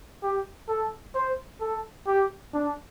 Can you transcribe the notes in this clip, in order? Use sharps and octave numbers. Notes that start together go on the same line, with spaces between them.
G4
A4
C5
A4
G4
D4